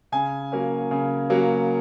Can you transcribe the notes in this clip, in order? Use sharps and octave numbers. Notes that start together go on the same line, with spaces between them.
C#3 G#5
F#3 A#3 C#4
C#3
F#3 A#3 C#4